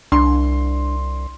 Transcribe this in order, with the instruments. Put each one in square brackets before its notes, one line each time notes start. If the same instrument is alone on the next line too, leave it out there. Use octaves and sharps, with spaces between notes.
[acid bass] C2 [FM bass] D4 [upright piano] C6